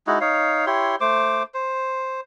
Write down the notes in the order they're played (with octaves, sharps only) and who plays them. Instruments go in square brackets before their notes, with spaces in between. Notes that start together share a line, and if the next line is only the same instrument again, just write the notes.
[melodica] G#3 D#4 E4 F#4
D#4 C#5 F5
E4 G4 C#5 C6
A3 C5 D6
C5